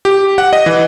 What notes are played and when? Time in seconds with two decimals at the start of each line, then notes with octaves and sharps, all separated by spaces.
0.05 G4
0.38 F#5
0.53 D#5
0.66 E3